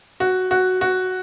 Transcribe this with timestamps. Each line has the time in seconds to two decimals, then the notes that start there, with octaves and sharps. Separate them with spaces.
0.20 F#4
0.51 F#4
0.81 F#4